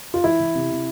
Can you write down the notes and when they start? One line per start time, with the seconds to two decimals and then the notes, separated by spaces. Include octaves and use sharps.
0.14 F4
0.24 E3 E4
0.40 E3
0.55 C3
0.70 C3